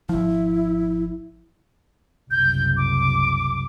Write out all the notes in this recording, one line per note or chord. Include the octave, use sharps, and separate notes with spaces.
G#1 F3 E4
F#1 C2 G6
D6